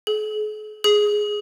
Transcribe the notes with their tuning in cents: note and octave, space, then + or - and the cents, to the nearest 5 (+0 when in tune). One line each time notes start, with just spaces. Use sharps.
G#4 +45
G#4 +0